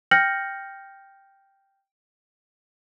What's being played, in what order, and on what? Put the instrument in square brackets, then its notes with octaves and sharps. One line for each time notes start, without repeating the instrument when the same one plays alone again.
[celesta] G5 F6 G6 A#6 C#7 F#7